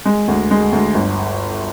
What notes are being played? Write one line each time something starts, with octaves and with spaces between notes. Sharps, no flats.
G#3
D2
G#3
D2
G1